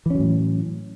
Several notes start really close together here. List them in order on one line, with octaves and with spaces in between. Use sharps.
E3 C#4 F#3 A2